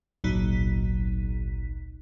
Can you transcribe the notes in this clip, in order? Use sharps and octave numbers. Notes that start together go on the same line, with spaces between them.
G#1 C#2 A#2 F#3 D#4 B6